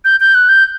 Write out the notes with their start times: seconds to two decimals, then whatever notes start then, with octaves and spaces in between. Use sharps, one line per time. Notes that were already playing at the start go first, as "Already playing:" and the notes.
0.05 G6
0.20 G6
0.35 F#6
0.49 G6